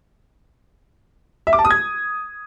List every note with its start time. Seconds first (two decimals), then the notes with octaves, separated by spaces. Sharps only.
1.47 E5
1.53 D6
1.59 A5
1.65 D#6
1.71 G#6